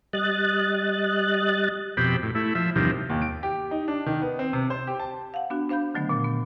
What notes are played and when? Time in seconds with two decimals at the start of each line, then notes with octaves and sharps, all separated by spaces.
0.13 G3 D#5 F#6 A6
1.97 F2 B2 C4 G4 B5
2.23 A2
2.35 A3 E4
2.55 F3 E5
2.76 E2 G2 C3 D#3 F3
3.10 D#2
3.22 D7
3.43 G4
3.71 D#4
3.88 D4
4.06 D#3
4.22 B3
4.39 C4
4.53 C3
4.70 C5
4.87 G4
5.00 A5
5.34 F5 F#5
5.50 B3 D4 F#4
5.69 D4 C5 F5 B5 G6
5.94 D3 D#3 F#3 A3 B3
6.09 A#2 B3
6.24 B3